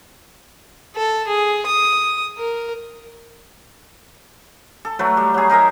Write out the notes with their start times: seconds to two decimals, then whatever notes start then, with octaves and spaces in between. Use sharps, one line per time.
0.96 A4
1.27 G#4
1.66 D#6
2.38 A#4
4.85 A4
4.99 F#3 A3 B4
5.17 G3
5.34 F#3 G#4
5.50 D#4 A#4 D#5 E5